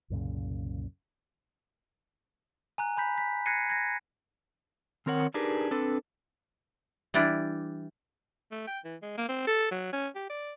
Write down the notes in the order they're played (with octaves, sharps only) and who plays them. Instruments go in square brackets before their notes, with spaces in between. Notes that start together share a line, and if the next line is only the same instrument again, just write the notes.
[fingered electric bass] C2 F#2 A#2 C#3
[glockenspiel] G#5 A#5 F#6
G#5 B5 G6 B6
B6
F#6 G#6 A#6 C7 C#7 D#7
G#6 A#6
[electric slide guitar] D#3 C4 A#4 C#5 F#5
D4 D#4 G4 G#4 A#4 B4
C4 D4 A4 B4
[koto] E3 G3 D4 E4
[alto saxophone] A3
G5
E3
G#3
A#3
C4
A4
F#3
C#4
G4
D5